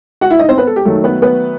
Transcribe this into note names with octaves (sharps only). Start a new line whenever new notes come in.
F#4 F#5
E4 E5
D#4 D#5
C4 C5
B3 B4
A4
G4
D#3 F#3 A3 A4
B3 B4
B3 B4